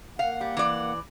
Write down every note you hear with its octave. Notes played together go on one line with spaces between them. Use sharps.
A#3 F5 F#5
G3
E3 D5